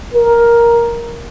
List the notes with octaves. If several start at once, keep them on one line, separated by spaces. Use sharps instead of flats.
A#4